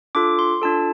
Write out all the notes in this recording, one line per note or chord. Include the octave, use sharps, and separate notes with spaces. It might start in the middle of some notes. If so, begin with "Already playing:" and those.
D4 F4 A4 D6
C6
D4 F4 A4 A5